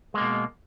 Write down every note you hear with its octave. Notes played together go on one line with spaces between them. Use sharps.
B2 G#3 A#3